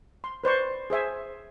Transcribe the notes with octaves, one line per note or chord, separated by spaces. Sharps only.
C6
B4 C5 D5 C#6
G#4 C5 E5 G#5